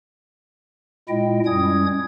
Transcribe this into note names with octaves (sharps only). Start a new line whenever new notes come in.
A#2 G#3 E4 D#5 G5
F#2 G3 C#4 D#6 G#6